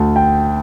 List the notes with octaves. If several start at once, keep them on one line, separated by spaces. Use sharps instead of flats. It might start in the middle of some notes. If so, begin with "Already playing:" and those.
Already playing: D2 A5
G5